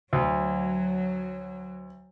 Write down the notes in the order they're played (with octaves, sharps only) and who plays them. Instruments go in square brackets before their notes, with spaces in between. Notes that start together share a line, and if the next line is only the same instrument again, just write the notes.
[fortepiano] D2 [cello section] F#3